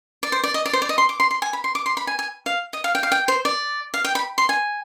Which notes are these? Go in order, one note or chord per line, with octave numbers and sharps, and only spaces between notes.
D5
C5
D5
D#5
D5
C5
D5
D#5
C6
D6
C6
C6
G#5
B5
C6
D6
C6
B5
G#5
G#5
F5
D#5
F5
G5
F5
G5
C5
D5
F5
G5
B5
C6
G#5